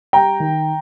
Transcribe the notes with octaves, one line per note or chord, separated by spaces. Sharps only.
G3 G5 A#5
D#3